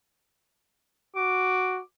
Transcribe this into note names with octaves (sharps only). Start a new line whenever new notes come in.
F#4 D6